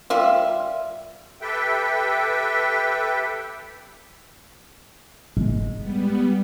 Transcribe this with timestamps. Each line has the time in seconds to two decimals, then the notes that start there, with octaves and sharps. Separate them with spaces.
0.10 G3 F4 E5
1.42 G4 A4 B4 E5 G5
5.37 G#3
5.76 G3 B3